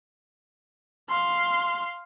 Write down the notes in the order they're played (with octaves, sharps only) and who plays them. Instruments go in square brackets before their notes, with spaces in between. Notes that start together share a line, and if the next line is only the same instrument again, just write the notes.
[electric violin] F5 C6